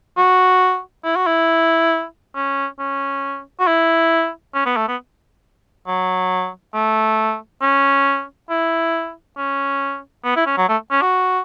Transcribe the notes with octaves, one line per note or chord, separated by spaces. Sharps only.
F#4
E4
F#4
E4
C#4
C#4
F#4
E4
C#4
B3
A3
B3
F#3
A3
C#4
E4
C#4
B3
E4
C#4
F#3
A3
C#4
F#4